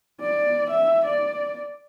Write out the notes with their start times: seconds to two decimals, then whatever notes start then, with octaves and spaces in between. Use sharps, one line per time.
0.21 D5
0.70 E5
1.05 D5